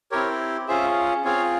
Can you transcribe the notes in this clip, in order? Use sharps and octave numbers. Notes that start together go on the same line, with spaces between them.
C4 E4 G4 A#4 C#5
C#4 F4 G#4 C5 E5
C4 F4 G#4 C#5 F5